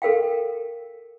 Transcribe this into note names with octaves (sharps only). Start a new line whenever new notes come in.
A4 A#4 F5 G5